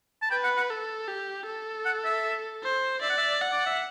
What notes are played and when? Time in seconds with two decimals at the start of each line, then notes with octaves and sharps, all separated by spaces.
0.22 A5
0.31 B4 G5
0.44 F#5
0.57 F#5
0.70 A4
1.08 G4
1.47 A4
1.85 F#5
2.05 E5
2.64 C5
3.02 D5 E5
3.10 F#5
3.18 E5
3.41 F#5
3.52 D5
3.66 E5